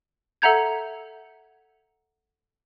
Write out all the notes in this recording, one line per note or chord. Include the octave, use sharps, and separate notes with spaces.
A4 E5 F#5 A#5 G6 G#6